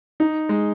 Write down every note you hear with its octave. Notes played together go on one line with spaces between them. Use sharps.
D#4
G#3